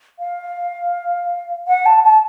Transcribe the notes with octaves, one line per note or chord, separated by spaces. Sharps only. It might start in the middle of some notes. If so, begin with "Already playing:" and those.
F5
F#5
A5
A5